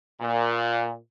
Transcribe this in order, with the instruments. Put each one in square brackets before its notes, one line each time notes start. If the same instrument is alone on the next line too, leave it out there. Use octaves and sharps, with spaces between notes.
[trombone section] A#2